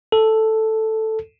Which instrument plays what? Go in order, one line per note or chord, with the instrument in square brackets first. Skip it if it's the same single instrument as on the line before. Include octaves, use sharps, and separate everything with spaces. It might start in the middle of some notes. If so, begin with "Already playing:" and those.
[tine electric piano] A4